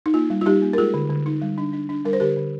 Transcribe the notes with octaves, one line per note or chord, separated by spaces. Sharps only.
D#4
A#3 F4
G3
F4
G3 D#4 G4
A#3
A#4
G#3 F4 G#4
D3
D3
D#4
G3
D4
D4
D4
G3 A#4
C5
D3 G4 A#4
D3